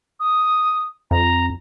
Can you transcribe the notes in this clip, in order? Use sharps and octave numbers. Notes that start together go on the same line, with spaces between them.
D#6
F2 A#5